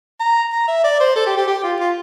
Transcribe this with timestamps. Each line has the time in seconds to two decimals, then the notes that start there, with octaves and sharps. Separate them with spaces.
0.20 A#5
0.52 A#5
0.68 E5
0.84 D5
1.00 C5
1.15 A4
1.26 G4
1.36 G4
1.47 G4
1.63 F4
1.79 F4